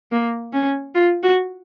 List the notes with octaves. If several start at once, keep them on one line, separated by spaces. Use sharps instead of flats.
A#3
C#4
F4
F#4